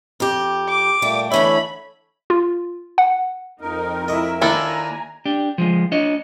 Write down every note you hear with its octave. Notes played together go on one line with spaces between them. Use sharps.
F2 G4
D6
A#2 G3 A3
D3 E3 A3 C#5 E5 B5
F4
F#5
F2 D#4 A#4
E4 D#5 E5 C#6
D#2 D4 E4 F4 A4 G#5 A#5
D4 G4
F3 F#3 G#3
D4 C#5 D#5